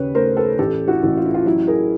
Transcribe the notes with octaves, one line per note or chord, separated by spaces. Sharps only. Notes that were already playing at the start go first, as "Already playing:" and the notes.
Already playing: D#2 C#3 B4 C#5
A3 A#4 C5
A4 B4
A1 G4 A4
E4 F#4
A1
F4
E4
F4
F#3 E4
G#4 A#4